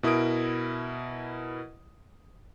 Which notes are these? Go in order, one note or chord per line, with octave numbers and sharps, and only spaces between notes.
B2 E4 A#4 D#6 D7